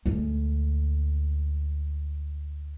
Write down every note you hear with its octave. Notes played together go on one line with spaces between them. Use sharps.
D2 G#3